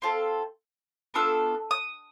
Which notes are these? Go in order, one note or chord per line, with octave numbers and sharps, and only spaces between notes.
C4 F4 A4
B3 D4 F4 A4 E6
D#6